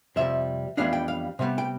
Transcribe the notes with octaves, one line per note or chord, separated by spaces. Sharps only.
F2 C3 G3 E5
F2 E3 G3 B3 D4 F5
G5
F5
C3 G3 B3
G5